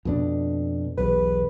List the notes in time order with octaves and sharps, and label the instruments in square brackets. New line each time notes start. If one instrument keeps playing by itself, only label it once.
[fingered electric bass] F2 B2 D4
[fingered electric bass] B1 E2 [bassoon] B4